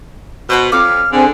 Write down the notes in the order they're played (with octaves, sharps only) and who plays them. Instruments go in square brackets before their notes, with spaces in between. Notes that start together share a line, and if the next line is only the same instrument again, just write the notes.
[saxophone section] B2 [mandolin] C5 F#5 B5
[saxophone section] F2 [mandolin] C#5 F5 D6 [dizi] F6
[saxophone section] D3 [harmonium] C4 G#4